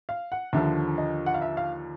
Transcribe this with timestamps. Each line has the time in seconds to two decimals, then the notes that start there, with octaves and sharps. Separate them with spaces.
0.09 F5
0.32 F#5
0.53 D#2 D3 F3 E5
0.98 D#5
1.26 F#5
1.34 F5
1.42 E5
1.57 F5